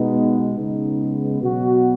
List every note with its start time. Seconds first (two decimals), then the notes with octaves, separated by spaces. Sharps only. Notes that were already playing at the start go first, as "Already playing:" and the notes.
Already playing: B2 G#3 B3 D#4
0.58 C#3 G#3 B3 D#4
1.42 B2 F#3 B3 F#4